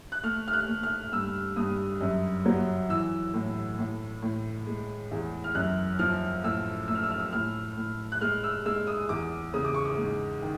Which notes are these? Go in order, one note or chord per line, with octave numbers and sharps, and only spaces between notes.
F#6
A3 F6
F6
F#6
A3
F6
G2 E6
G2 D#6
F#2
F#3
E3 E6
A2
A2
A2
G#3
E2
F6
F#2 F#6
F3 F6
A2 E6
A3 E6
F6
E6
F6
E6
A2 F6
A2
F#6
G#3 F6
E6
G#3 E6
D#6
E2 D6
C#3 D#6
D6
C#6
D6
G#2
D#3